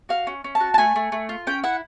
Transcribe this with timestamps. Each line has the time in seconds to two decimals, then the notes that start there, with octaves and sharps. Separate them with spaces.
0.09 F#4 F5
0.27 C#4
0.44 C#4
0.55 A5
0.60 F#4
0.74 A5
0.78 A3 G#5
0.96 A3
1.12 A3
1.29 F4
1.47 C#4 G5
1.64 E4 F#5